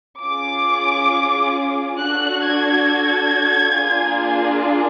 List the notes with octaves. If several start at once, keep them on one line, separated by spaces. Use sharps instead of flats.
C#4 F4 G#4 D6
D4 F#4 A4 F#6
G#6
A#3 D4 F4 G#4